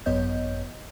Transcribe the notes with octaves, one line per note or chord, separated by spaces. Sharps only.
G#1 F#2 B3 C#5 D#5 G6